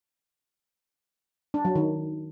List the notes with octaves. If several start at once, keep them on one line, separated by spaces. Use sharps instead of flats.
D4
F#3
D#3